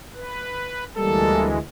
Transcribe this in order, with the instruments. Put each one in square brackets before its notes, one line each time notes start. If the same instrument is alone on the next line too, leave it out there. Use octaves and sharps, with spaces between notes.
[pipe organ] B4
[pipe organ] D2 E3 G#3 [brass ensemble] G3 A#3 A4